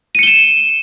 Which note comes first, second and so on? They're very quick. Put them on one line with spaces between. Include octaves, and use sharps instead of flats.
D#7 C#7 G7 E7